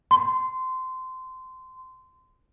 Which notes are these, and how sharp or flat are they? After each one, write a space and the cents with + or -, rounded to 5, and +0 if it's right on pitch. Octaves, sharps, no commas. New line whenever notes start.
C6 -20